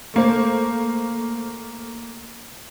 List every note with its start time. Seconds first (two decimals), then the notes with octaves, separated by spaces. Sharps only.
0.14 A3 A#3 C5